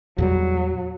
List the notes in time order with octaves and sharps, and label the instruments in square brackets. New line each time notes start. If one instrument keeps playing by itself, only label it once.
[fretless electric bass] E2 A#2 G3 [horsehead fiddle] F#3